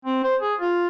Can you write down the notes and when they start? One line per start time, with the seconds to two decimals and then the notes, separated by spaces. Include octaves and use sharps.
0.05 C4
0.24 C5
0.41 G#4
0.60 F4